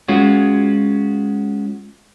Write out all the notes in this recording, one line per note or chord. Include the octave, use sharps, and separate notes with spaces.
G#3 C#4 F4 F#4